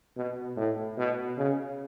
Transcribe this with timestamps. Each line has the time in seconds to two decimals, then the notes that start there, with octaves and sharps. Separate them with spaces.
0.17 B2
0.57 A2
0.98 B2
1.38 C#3